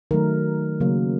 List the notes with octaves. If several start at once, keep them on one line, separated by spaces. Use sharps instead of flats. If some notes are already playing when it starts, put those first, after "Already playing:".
D#3 F#3 A3 A#4
C#3 F#3 A#3